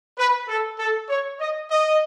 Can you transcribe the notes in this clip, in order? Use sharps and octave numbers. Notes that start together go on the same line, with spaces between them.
B4
A4
A4
C#5
D#5
D#5